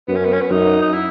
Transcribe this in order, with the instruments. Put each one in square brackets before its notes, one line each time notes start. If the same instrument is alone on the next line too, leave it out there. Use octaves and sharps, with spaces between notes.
[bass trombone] F#2 [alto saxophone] B3
[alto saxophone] C#4
B3
C#4
B3
[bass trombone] F#2 [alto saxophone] D#4
[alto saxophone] D#4
E4